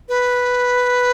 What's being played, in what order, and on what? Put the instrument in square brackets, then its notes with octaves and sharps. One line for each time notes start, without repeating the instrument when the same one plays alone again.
[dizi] B4